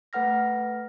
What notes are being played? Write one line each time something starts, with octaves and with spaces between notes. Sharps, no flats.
A3 B4 F#5 F6 A#6